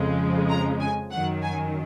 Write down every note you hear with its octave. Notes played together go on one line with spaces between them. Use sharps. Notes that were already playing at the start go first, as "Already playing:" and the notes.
Already playing: F2 C#3 F3 G#3
A#5
G#5
F#2 D#3 F#3 F#5
G#5